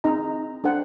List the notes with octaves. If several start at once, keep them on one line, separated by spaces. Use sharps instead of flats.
C4 D#4 G#4 D#5 A#5
D4 A4 C5 F#5 G5